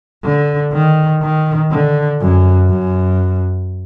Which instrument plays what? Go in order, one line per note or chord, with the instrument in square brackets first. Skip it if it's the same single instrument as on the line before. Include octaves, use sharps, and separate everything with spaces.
[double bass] D3
D#3
D#3
D3
F#2
F#2